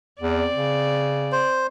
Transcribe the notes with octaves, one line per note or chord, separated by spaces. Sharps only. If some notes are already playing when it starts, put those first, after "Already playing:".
E2 C4 D5
C#3
C5